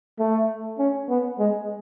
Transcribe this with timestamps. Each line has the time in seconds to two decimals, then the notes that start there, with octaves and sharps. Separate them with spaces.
0.19 A3
0.79 C#4
1.09 B3
1.39 G#3